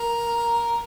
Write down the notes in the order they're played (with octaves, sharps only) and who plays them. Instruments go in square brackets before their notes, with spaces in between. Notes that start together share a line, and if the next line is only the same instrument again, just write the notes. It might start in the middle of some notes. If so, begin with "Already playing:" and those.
Already playing: [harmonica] A#4